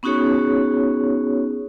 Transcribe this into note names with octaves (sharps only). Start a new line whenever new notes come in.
B3 C#4 D#4 F#4 G#4 C#5